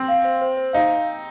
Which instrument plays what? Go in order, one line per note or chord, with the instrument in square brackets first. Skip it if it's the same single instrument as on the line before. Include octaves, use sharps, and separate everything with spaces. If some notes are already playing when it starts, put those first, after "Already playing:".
Already playing: [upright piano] C4
[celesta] F5
C5
C5
C5
[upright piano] D#4 [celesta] F5